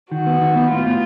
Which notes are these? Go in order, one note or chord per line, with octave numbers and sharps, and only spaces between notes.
D#3 F#4
B3
D#3
B3
A2 F4
A2